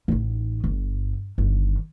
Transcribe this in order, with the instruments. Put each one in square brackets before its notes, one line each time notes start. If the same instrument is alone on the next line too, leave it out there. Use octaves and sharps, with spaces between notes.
[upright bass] A1 D#4
G1
G1 D#3